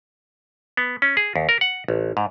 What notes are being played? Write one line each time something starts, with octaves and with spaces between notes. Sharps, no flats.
B3
C#4
G#4
D#2
A#4
F#5
A1
G#2